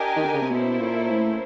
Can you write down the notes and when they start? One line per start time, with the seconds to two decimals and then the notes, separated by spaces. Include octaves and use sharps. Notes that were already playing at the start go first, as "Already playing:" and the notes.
Already playing: D4 G4 A#4 D#5 G#5
0.16 D#3
0.25 D3
0.34 C#3
0.41 C3
0.50 B2 A#3 C#4 E4 A4 C5
0.80 A#2
1.10 A2